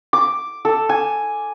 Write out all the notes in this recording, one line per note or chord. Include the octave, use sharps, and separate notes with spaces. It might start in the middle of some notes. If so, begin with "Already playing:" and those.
D6
A4
G#5